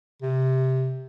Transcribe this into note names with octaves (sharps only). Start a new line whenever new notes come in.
C3